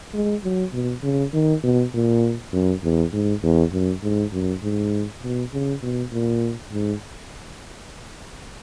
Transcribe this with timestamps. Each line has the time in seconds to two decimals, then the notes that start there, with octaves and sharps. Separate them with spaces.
0.14 G#3
0.44 F#3
0.73 B2
1.03 C#3
1.33 D#3
1.64 B2
1.94 A#2
2.53 F#2
2.84 E2
3.13 G#2
3.43 E2
3.73 F#2
4.03 G#2
4.33 F#2
4.63 G#2
5.23 B2
5.53 C#3
5.82 B2
6.12 A#2
6.72 G#2